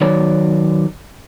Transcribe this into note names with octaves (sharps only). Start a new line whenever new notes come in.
D#3 F#3 C#5 D5